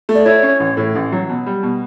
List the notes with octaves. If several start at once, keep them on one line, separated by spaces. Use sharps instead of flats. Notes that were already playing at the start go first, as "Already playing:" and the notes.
A3
D5
E4 C#5
C#4
A1
A2
A1
F#3
B2
G3
B2